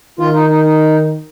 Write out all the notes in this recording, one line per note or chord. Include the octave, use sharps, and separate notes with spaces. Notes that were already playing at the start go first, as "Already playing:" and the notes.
D#3 F4
D#4
D#4
D#4